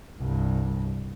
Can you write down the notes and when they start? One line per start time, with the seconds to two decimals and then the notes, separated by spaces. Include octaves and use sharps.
0.18 C2 G2